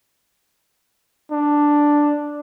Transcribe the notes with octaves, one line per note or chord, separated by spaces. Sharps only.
D4